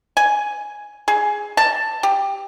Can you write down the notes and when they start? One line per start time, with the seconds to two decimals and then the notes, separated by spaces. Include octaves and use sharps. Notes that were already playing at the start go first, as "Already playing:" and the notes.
0.17 G#5
1.08 G#4
1.57 A5
2.03 G4